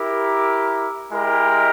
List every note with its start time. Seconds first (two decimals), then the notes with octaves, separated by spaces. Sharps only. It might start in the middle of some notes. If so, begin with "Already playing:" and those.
Already playing: E4 G4 A#4
1.11 G#3 E4 G4 A#4